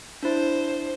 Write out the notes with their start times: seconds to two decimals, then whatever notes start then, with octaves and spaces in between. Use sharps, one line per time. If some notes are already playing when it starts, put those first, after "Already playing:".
0.23 D4 E4 C5